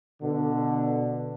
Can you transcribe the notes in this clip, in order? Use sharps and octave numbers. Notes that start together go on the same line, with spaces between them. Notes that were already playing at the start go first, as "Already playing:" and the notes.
B2 D3